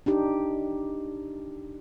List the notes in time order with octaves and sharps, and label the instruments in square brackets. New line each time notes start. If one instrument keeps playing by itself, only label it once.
[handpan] D4 D#4 G4